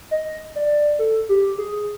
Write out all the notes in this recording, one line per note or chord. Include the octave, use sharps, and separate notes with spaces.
D#5
D5
A4
G4
G#4